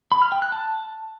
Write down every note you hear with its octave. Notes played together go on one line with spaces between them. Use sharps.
B5
F6
G5
F#6
A5